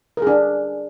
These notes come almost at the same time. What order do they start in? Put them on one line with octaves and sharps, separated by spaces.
A#4 G#4 D4